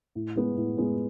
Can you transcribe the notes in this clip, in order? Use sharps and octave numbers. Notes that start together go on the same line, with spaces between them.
A2
G#3 B3
A2
G#3 B3